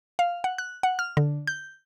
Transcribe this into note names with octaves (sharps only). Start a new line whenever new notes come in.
F5
F#5
F#6
F#5
F6
D3
G6